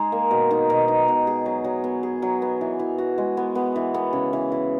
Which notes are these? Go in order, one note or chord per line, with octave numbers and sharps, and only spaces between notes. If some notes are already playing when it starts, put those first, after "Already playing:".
Already playing: G#3 D#4 G#4
A#3
B2
D#4
B2
D#4
B2
G#4
F#3
F#3
B3
G#4
F#3
B3
E3
E3
F#4
G#3
B3
B3
E3
B3
C#3
E3
E3